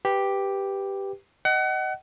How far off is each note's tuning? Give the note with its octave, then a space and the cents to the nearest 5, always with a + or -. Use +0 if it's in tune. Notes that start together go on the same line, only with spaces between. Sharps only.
G4 +0 B4 +0
D#5 -5 F#5 +30